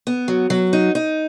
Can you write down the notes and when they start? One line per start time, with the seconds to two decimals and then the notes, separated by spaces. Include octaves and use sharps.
0.07 B3
0.28 F#3
0.50 F#3
0.73 D#4
0.95 D#4